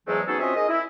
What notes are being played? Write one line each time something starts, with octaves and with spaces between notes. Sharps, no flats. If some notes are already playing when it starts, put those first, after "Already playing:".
E2 G#2 E3 F#3 G#3 A3
B3 C#4 D#4 F#4 G#4 A4
C4 C#4 F4 F#4 D#5 E5
D#4 G#4 A#4 D#5
E4